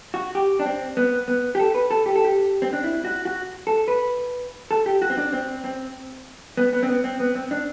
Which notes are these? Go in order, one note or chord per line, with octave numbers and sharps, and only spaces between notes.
F#4
G4
D4
C4
B3
B3
G4
A4
B4
A4
G4
A4
G4
C4
D4
E4
F#4
F#4
A4
B4
A4
G4
F#4
C4
D4
C4
C4
B3
B3
C4
B3
C4
B3
C4
D4